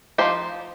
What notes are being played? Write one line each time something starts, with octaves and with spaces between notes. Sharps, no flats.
F3 C4 D#4 G4 C5